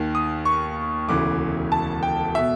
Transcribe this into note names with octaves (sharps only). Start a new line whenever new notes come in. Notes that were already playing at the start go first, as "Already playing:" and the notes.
Already playing: D#2 D#3
D#6
C#6
E1 D2 C#3 E3 D6
A5
G5
B2 E5